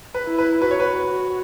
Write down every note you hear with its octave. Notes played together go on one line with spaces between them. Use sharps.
B4
E4
B4
F#4 B4
C#5
B4